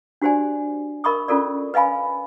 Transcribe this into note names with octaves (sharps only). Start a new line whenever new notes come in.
D4 F#4 G4 C5 D5 G#5
A#4 D#5 B5 C#6 D#6
C#4 F4 A4 A#4 D5
B4 D#5 F5 G#5 B5